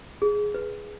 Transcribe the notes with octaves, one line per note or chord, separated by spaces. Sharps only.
G#4
B4